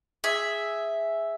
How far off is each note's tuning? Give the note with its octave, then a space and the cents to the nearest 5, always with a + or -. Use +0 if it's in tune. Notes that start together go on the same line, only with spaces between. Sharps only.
G#4 +0 E5 +0